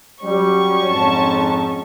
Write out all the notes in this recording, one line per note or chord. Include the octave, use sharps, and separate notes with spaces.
F#3 G3 C#4 C#6
F2 G#2 A5